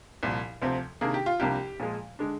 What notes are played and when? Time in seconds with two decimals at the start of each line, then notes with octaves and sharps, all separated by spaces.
0.23 C2 A#2 F3
0.62 D2 C3 F3 C4
1.01 C3 D#3 A#3 D4 G#4
1.14 G4
1.26 F4
1.40 C2 C3 F3 A#3 D4 G4
1.80 A#2 F3 G#3
2.19 D3 G#3 D4